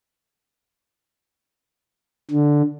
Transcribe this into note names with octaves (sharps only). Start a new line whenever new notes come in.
D3